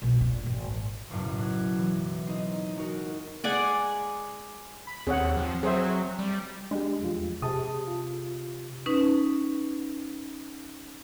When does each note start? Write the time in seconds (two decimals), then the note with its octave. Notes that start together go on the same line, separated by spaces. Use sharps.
0.02 A#1 B2
0.17 A#1 A#2
0.46 G#1
0.67 E2
1.09 F#1 B1 F#2 A2
1.41 F#6 G#6
1.78 E3 F#3
2.26 C4 D#4 D#5
2.76 G#3 D#4 F#4 A#4
3.44 G#3 D5 F#5 G#5
4.87 B5
5.07 D#2 C4 G#4 C#5 F#5
5.37 F3
5.63 F#3 G#4 C5 E5
6.19 G3
6.71 G#3 D4 G4
7.01 E2 F3 F4
7.42 C3 G#4 A5 D#6
7.87 F4
8.86 C#4 D#4 B4